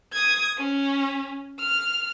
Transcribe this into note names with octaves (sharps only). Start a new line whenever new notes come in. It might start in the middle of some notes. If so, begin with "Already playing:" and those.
D#6 G#6
C#4
F6